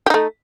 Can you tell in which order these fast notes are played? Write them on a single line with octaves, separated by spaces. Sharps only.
G4 D#4 A3